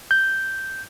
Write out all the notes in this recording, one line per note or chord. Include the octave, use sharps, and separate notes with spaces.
G6